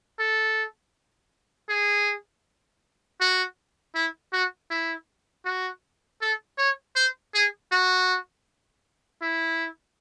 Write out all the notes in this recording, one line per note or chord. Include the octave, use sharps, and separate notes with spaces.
A4
G#4
F#4
E4
F#4
E4
F#4
A4
C#5
C5
G#4
F#4
E4